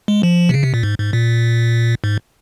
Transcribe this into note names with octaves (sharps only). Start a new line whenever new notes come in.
G#3
F3
C3
C#3
C3
A#2
G#2
G#2
A#2
G#2